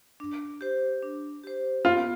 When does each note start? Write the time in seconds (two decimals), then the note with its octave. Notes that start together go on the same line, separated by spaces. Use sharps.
0.20 D4
0.61 G4 C5
1.02 D4
1.43 G4 C5
1.85 B3 F4